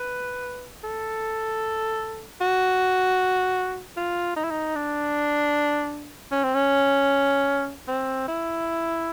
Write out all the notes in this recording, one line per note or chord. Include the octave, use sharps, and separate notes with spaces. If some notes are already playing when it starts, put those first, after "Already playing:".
Already playing: B4
A4
F#4
F4
D#4
E4
D#4
D4
C#4
C4
C#4
C4
E4